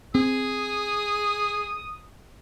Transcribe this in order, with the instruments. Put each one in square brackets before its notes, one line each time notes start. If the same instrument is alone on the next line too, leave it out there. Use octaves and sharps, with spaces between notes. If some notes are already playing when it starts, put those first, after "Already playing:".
[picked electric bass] C4 [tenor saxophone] G#4 [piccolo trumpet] D#6